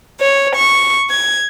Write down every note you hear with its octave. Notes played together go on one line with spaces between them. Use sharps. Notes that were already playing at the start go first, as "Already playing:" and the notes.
C#5
C#6
G#6